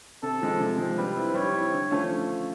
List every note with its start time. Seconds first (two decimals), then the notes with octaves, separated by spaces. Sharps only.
0.23 C3 A4
0.42 F3 G#3
0.60 C3
0.78 F3 G#3
0.98 G3 B4
1.16 C4 E4
1.34 G3 C#5
1.53 C4 E4
1.72 D3
1.91 F3 A3 C#4 F4